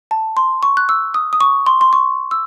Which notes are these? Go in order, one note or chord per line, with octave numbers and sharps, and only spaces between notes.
A5
C6
C#6
F#6
E6
D#6
D#6
C#6
C6
C6
C#6
E6